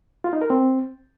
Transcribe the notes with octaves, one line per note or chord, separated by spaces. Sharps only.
F4
D#4
A#4
C4